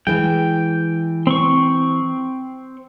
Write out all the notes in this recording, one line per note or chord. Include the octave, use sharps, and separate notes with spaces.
E3 G#3 G5
C4 C#6